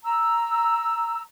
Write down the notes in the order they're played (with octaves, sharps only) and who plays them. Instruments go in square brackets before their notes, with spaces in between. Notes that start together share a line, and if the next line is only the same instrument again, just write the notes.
[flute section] A#5 E6